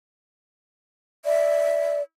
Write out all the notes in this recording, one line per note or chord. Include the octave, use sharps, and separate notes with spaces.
D5 E5